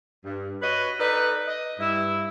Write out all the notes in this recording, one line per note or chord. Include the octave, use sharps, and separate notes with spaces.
G2
F#4 B4 C#5 D#5
D#4 A4 B4 D5
D#5
G2 E4